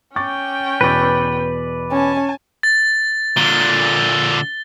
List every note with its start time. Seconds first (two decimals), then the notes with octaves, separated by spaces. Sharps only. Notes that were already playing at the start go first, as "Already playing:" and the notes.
0.16 C#4 G5 C#6 D6 A6
0.81 E2 B2 B4 D5
1.91 C#4 G#5 A5
2.63 A6
3.37 A#2 D3 G7